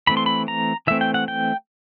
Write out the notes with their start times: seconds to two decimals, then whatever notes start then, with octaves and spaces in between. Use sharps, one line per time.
0.07 E3 A3 C4 B5
0.17 C6
0.26 B5
0.48 A#5
0.87 E3 A3 C4 E5
1.01 G5
1.14 F#5
1.28 G5